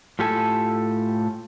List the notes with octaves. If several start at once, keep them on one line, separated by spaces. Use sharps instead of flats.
A2 F4 G4 A4 G#5